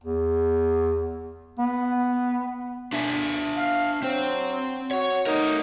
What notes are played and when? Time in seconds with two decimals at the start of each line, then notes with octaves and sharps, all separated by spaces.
0.03 E2
1.58 B3
2.93 D4 E5 G#5
3.57 F5
4.02 F#3 C4 C5
4.91 F#4 C#5
5.27 A3 D#4 A#4